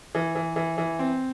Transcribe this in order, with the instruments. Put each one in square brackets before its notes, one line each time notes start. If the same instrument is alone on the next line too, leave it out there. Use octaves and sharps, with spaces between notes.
[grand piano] E3
E3
E3
E3
C4